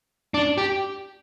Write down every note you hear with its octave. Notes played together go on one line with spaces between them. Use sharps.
D4
G4